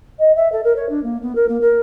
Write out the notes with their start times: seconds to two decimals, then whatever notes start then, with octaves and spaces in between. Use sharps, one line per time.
0.19 D#5
0.35 E5
0.52 A4
0.63 A#4
0.76 C#5
0.89 D4
1.03 A#3
1.22 B3
1.35 A#4
1.48 A#3
1.61 A#4